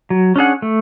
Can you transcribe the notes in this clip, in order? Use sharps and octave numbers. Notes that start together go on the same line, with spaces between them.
F#3
C#4 D4 G#4 F#5
A3